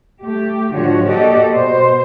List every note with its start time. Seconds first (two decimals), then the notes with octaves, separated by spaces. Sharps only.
0.21 A3 G4
0.74 G#2 D3 F3 F#4 C#5
1.07 A#3 F#4 G4 A4 D5 D#5
1.54 B2 C5